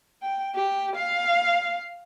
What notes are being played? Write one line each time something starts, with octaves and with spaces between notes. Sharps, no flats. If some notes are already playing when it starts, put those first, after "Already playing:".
G5
G4
F5